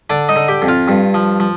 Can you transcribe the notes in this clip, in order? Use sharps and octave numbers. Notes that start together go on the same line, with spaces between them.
D3 D4 D5
D#4 D#5
D3
G4 G5
F2
F4 F5
G2
F3
F3